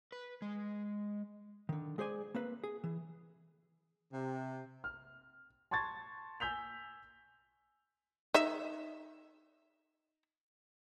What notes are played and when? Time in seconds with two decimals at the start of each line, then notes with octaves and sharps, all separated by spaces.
0.12 B4
0.42 G#3
1.69 D3 D#3
1.98 G#3 G#4 C5 D5 G#5
2.35 A#3 C4 B4
2.64 G#4
2.84 E3
4.13 C3
4.84 F6
5.71 A5 C6 C#6 G#6 A6
6.40 G#5 E6 G6 B6 F7
8.34 D#4 E5